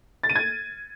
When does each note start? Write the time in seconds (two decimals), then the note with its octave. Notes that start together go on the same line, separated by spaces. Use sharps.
0.23 A6
0.30 D#7
0.36 G#6